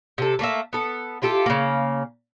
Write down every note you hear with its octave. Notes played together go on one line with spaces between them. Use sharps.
C3 A4
A3 A#3 B4 E5
B3 A4
E4 F4 G4 A4
C#3 A#3